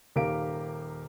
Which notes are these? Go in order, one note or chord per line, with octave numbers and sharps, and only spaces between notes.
D#1 D#2 G4 A#4 F5 D7